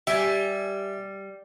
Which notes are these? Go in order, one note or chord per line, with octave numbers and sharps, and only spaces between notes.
G3 G4 E5 G#5